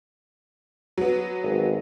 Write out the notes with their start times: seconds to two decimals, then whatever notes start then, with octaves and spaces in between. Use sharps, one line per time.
0.97 F#3 B3
1.43 G#1